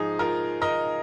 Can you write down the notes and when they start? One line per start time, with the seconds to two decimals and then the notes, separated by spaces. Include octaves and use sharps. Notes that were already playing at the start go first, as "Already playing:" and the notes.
Already playing: G#2 F3 G#3 D#4 G#4
0.19 F4 A#4
0.62 A#4 D#5